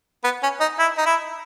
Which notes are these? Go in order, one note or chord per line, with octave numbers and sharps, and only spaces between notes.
B3
C#4
D#4
E4
D#4
E4